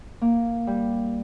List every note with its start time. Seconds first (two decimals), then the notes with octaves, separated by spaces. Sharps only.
0.21 A#3
0.67 G3